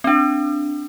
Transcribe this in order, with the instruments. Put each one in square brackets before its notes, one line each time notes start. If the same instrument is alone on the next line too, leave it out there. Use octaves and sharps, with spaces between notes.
[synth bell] C4 D4